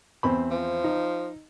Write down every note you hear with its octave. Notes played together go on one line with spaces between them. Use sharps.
E2 C4 B5
F3
D#4